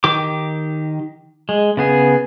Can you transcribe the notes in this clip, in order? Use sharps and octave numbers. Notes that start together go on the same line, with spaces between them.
D#3 G4 D6
G#3
C#3 B3 G#4